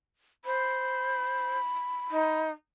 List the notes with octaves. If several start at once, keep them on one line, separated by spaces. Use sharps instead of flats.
C5 B5
D#4